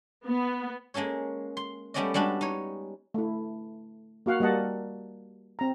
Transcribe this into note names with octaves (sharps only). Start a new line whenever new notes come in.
B3
G#3 A#3 C#4 A4 C#5
C6
G3 A3 B3 C#4 D5 D#5
G3 G#3 D4 F#4 A4
D#4 C#5
A3 E4
A#3 F#4 F5 F#5
G3 A#3 D#5 F#5 A5
C4 A#5